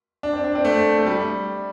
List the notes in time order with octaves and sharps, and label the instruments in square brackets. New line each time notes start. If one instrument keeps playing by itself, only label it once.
[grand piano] D4
C4
D4
C4
A3
A3
G3